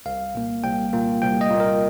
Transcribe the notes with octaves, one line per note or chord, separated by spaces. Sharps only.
C2 F5
A#2 A#3
C2 G5
A#2 A#3
C2 G5
D#5
A#2 A#3
A#4